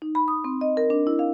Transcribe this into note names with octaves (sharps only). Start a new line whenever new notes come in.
D#4
B5
D#6
C4
D#5
A#4
D4
E4
F5